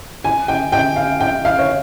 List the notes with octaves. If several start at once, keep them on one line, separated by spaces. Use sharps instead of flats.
G#5
G5
G5
F5
G5
F5
C#5